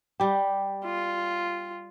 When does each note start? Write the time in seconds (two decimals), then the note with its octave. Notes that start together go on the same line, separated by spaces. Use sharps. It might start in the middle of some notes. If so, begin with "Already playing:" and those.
0.20 G3 G4 G5
0.85 F4